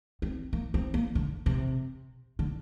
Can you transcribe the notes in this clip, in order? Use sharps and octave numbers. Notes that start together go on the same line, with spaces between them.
C4
A#3
C4
A#3
D3
C3
D3